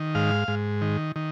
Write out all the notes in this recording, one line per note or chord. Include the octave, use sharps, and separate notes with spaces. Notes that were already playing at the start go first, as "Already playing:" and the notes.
Already playing: D#3
G#2 F5
G#2
D#3
D#3